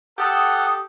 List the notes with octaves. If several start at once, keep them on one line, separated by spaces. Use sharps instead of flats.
G4 A4 F#5 A5 D#6